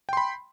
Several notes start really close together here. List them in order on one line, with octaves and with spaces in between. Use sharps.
G5 C6 B5